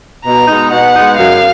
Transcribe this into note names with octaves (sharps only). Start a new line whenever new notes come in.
B2 A#5
G#3 B3 D#4
B2 F#5
G#3 B3 D#4
F#2 F5